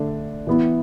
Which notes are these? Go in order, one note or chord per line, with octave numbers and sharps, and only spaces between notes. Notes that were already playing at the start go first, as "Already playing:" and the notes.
Already playing: D3 A3 D4
E3 B3 E4